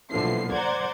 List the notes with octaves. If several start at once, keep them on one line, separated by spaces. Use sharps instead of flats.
B1 A#2 D3 E3 F3 C7
C5 D5 F#5 A#5 D6 G#6